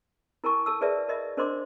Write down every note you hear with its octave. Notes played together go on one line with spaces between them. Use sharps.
E4 A#4 G#5 A5 C#6
A4 A5 E6
G#4 A#4 B4 D5 E5 A5
A#4 D#5 E5
D4 A#4 C5 D#5 C6 D6